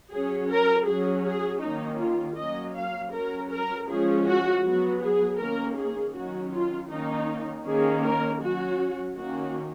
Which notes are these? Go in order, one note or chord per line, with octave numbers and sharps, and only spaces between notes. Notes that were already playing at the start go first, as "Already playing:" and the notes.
F#3 C#4 G#4
A#4
F#3 C#4 G#4
G#4
D#3 A#3 C#4 D#4
F4
F#3 A#3 C#4 D#5
F5
F#3 C#4 A#4
A#4
F3 G#3 C#4 G#4
F#4
F#3 B3 F#4
G#4
D#3 A#3 C#4 A#4
G#4
D#3 F#3 C#4 F#4
F4
D#3 A#3 C#4 D#4
D#3 A#3 C#4 G#4
A#4
F#3 C#4 F#4
D#3 A#3 C#4 F#4